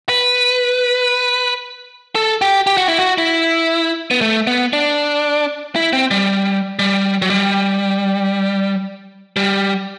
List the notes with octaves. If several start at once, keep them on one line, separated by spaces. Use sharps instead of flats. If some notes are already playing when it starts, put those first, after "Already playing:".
B4
A4
G4
G4
F#4
E4
F#4
E4
B3
A3
B3
D4
E4
C4
G3
G3
F#3
G3
G3